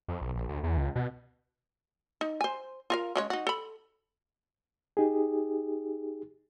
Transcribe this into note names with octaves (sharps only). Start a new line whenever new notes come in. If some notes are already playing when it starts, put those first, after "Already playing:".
F2
B1
A#1
D2
E2
C#2
B2
D#4
C5 G#5
F4 A#4 F5
C#3 G#3 C#5
D#4 F#4
A4 B5
D#4 G4 G#4